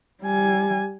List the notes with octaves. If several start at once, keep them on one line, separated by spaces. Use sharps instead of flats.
G3 G#5